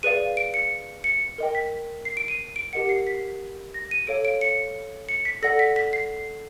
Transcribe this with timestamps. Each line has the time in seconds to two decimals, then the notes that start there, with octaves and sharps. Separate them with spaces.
0.03 G#4 B4 D5 F5 D#7
0.37 D7
0.54 C#7
1.04 C#7
1.38 A#4 D#5 G5
1.55 B6
2.05 C7
2.17 D7
2.28 D#7
2.56 D7
2.73 G4 A#4 D#5 F#5 C#7
2.89 C7
3.07 B6
3.74 A#6
3.91 D#7
4.07 A4 C#5 F5 D7
4.25 D7
4.41 C#7
5.09 C#7
5.25 B6
5.42 A4 D5 F#5 A#6
5.59 B6
5.76 B6
5.93 C7